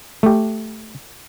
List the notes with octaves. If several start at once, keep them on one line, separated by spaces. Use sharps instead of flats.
A3 G4